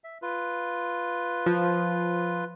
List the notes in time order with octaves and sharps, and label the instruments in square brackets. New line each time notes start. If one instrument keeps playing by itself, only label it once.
[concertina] E5
F4 B4
[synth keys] F3